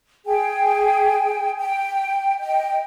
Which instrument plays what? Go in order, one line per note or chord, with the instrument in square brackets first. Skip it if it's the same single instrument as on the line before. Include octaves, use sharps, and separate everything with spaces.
[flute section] G#4 G5 G#5
G5
D#5 G5